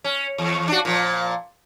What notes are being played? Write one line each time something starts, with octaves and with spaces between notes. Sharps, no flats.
C#4
E2
D4 F#4
A#2 F3